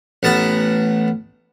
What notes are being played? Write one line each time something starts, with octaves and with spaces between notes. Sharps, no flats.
A1 B3 A5 A#5